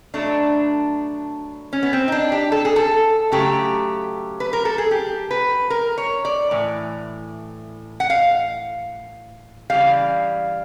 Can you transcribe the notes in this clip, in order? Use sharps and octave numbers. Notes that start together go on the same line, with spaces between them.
B2 F#3 A3 D4
C#4
B3
C4
D#4
D4
G4
A4
G#4
A4
C#3 F#3 A3 G4
B4
A#4
A4
G#4
G4
B4
A#4
C#5
D5
A2 E3
F#5
F5
C#3 E3 G3 F5